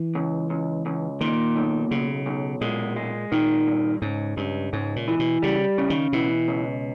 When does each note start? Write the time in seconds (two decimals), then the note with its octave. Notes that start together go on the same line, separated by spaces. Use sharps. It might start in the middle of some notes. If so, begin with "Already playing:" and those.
Already playing: E3
0.15 C#2
0.50 C#2
0.86 C#2
1.21 A#2 D#3
1.56 B1
1.91 B1 C#3
2.26 B1
2.61 A#2 G#3
2.96 G#3
3.32 A#2 D#3
3.67 G2
4.02 C#2 G#2
4.37 C#2 G2
4.73 C#2 G#2
4.96 A#2
5.08 E3
5.19 B2
5.42 C#3 G3
5.78 C#3
5.90 D#3
6.13 B2 E3
6.48 C#2